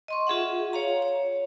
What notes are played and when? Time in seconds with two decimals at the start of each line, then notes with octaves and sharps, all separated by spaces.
0.08 D#5 C6 C#6
0.27 F4 G#4 E5 F#5
0.73 C#5 F5 A#5
1.02 C#5